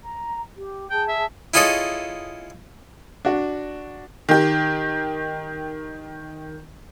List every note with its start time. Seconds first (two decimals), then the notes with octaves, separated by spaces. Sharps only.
0.02 A#5
0.56 G4
0.90 G#4 G5 A5
1.08 E5
1.54 E4 F4 G#4 A4 C#5 D#5
3.25 D4 F#4
4.29 D#3 G4